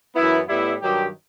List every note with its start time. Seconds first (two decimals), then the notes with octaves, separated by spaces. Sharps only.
0.15 F#2 E3 B3 E4
0.49 A2 G3 B3 E4
0.81 G2 D#3 F#3 G4